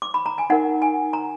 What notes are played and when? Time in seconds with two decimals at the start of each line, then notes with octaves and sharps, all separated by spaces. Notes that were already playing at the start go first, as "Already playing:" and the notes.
0.02 D6
0.14 B5
0.26 A#5
0.38 G#5
0.50 D#4 A#4 F#5
0.82 G#5
1.13 A#5